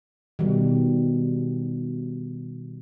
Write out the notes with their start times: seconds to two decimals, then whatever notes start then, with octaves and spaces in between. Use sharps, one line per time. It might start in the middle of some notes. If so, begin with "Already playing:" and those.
0.39 B2 D#3 G3